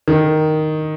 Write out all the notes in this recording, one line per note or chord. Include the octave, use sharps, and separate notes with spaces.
D#3